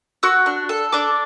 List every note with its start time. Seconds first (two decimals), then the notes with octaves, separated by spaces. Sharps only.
0.23 F#4 E6
0.46 D4
0.69 A4
0.92 D4 D6